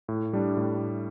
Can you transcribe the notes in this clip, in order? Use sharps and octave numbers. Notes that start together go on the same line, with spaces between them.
A2
G3 D4
A2